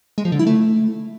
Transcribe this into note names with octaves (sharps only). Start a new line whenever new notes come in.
G#3
F3
D3
E4
A3